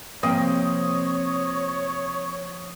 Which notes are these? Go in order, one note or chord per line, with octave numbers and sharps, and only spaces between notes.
C3 F3 A#3 C4 G4 C#5 D#5